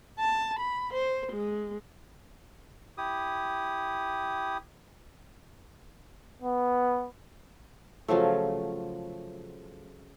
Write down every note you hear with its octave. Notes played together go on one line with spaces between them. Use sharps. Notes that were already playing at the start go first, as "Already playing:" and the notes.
A5
B5
C5
G#3
E4 G4 D#6
B3
C#3 F3 F#3 A3